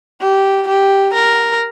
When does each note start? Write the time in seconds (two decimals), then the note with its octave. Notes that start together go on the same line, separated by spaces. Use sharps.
0.21 G4
0.68 G4
1.14 A#4